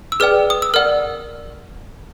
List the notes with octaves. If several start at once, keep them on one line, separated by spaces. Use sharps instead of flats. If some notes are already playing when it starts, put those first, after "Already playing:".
E6
G#4 B4 D5 G5 F6
D#6
E6
A#4 D5 F#5 F6